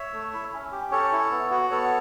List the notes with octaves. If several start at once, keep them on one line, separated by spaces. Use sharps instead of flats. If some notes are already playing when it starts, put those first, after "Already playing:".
Already playing: C#5 E5
A3
E4
C#4
G4
C#4 A4 C#5
E4
B3
F#4
B3 A4 C#5